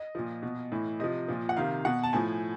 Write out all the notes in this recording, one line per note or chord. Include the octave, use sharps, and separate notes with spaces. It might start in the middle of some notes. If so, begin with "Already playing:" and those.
Already playing: D#5
A#2 F3
B2
A2 E3
C3 F3 D#5
A#2 F3
F#5
C3 D#3 F5
B2 F#5
A5
A2 F3 G#5